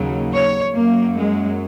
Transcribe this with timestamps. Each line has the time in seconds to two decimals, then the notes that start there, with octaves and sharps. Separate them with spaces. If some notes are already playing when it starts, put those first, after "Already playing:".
Already playing: D#2 C#3 F#3
0.33 C#5
0.75 F#2 F#3 A#3
1.16 G#3